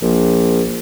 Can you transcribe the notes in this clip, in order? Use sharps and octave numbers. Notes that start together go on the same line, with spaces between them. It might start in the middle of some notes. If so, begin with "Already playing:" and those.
A#1